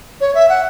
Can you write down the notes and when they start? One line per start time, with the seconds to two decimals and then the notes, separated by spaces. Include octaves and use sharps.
0.21 C#5
0.34 E5
0.49 F#5